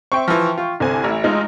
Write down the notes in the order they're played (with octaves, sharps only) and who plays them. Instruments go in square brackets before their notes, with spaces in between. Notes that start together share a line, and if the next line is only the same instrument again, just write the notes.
[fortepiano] C4 [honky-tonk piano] E5 G5 C#6
[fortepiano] E3 F3
F4
[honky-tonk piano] C2 C4 G#5 [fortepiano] D3
[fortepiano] A1 E4
[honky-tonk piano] G#3 D#4 F4